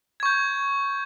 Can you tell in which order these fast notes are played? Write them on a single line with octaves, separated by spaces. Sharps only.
G#6 C#6 G6